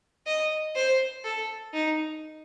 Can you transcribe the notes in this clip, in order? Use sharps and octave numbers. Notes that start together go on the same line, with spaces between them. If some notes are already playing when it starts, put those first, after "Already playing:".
D#5
C5
A4
D#4